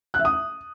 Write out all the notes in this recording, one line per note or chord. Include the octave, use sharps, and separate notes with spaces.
F#6
E5
D#6